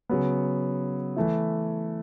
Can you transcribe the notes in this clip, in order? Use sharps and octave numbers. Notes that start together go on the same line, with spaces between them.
C#3 F#3 B3
E3 A3 E4